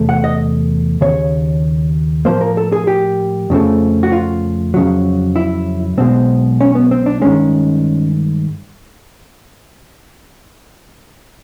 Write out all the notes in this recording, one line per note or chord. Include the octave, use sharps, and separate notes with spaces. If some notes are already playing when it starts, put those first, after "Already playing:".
Already playing: E2 C3 A3
F#5
D#5
D#2 C#3 C#5
A2 F3 A#3 C5
A#4
A4
G#4
G4
F2 C#3 F3 A3
F#4
F4
F2 C#3 F#3
E4
B1 B2 G#3 C4
C#4
B3
C4
D4
G2 D#3 G#3 C#4